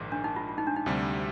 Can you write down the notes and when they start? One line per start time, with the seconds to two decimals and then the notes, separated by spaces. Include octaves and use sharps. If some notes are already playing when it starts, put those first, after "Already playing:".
Already playing: A#1 G#2 D#3
0.12 D4
0.24 D#4
0.36 F4
0.49 F4
0.58 D#4
0.67 D4
0.76 D#4
0.86 D2 C3 G3